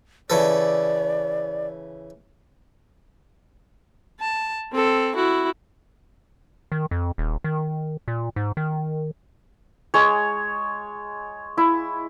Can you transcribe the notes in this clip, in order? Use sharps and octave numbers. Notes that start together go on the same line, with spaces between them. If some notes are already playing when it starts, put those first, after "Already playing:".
C#3 E3 A4 D5
A5
C4 A4
E4 F#4
D#3
F2
D#1
D#3
A#2
G#2
D#3
G#3 C#5
E4